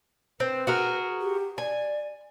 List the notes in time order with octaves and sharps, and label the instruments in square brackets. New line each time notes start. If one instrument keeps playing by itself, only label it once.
[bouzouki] C4 [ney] B4
[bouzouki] F#4 G#4 A#4
[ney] G4
[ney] D5 [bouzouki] G#5